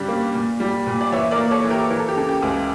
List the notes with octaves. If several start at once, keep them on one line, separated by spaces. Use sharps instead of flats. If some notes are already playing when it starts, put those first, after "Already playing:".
Already playing: G2 C#3 G3 D5
A#3
A#2
G3
A#2
D5
E3 C#5 E5
A#4 D5
A#3
A4 C#5
E3
G4 A#4
E3 A#4
A4
G4
C#3 A4
G4
C#2